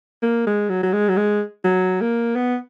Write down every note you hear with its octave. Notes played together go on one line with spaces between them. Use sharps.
A#3
G#3
F#3
F#3
G#3
F#3
G#3
F#3
A#3
B3